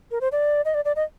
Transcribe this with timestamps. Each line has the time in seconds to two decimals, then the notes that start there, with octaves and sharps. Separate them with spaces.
0.11 A#4
0.21 C5
0.32 D5
0.65 D#5
0.74 D5
0.85 D5
0.96 D#5